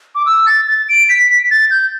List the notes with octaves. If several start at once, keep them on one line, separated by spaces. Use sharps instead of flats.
D6
E6
A6
A6
D7
B6
A6
G6